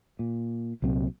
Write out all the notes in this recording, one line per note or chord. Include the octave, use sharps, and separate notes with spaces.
A#2
C2 A#2 F#3 C4